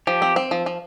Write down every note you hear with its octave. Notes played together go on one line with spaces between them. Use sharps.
F3 G4
C4
C4
F3
F3